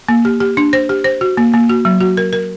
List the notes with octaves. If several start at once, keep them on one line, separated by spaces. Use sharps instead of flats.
A#3
G4
G4
D4
C5
G4
C5
F#4
A#3
A#3
F#4
F#3
F#4
A#4
A#4